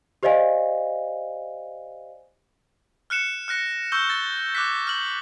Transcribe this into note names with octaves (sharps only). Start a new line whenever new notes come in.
G4 C5 D5 D#5 F5 G#5
F6 F#6 C#7 E7
F6 F#6 A#6 C#7
C#6 E6 G6 G7
A6
D6 F#6 B6
F6 F#7